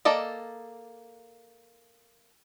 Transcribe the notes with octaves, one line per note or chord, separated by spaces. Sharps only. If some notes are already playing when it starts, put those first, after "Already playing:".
A#3 A4 D5 D#5